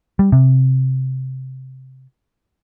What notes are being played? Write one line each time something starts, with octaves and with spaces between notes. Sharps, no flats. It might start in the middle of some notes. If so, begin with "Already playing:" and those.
G3
C3